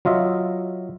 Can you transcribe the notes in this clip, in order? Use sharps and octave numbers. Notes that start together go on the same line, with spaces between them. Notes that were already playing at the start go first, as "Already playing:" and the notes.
F#3 F4 D#5 E5